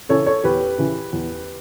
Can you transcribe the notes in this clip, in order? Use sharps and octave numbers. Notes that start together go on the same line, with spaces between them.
C#3 E3 A4 C#5
A4 C#5
E2 G4 B4
C#3 E3
E2